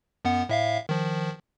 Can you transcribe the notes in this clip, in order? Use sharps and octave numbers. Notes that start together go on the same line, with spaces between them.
F#2 B3 F#5
A2 E5 F5
D#3 F3